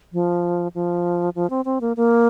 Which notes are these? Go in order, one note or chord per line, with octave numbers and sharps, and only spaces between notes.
F3
F3
F3
C4
C4
A#3
A#3